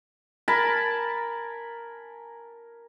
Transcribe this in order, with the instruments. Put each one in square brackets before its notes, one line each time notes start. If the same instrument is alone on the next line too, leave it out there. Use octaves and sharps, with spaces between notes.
[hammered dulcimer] A#4 G#5 A5 B5